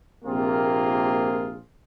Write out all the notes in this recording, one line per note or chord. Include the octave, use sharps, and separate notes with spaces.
A#1 C3 A#3 C4 F4 G#4